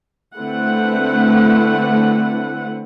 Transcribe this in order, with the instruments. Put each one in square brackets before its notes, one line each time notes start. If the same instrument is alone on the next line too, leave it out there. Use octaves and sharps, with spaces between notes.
[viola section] D3 A3 C4 E4 B4 F#5